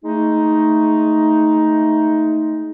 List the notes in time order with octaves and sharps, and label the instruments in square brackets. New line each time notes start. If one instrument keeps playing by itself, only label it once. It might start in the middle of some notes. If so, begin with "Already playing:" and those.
[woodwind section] G#3 A3 D#4